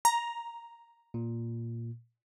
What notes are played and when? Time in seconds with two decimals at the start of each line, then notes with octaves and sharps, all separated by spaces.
0.05 A#5
1.14 A#2